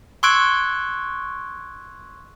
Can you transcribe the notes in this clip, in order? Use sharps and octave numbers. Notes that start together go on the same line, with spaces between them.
C6 C#6 E6 F#6 G#6 D7